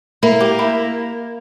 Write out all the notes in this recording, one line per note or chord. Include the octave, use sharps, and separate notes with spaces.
A#3 E4
G4
E4